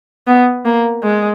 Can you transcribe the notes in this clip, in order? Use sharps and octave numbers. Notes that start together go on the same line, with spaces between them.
B3
A#3
G#3